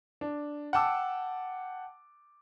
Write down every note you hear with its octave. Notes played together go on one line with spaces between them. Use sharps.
D4
F#5 G5 A5 D6 E6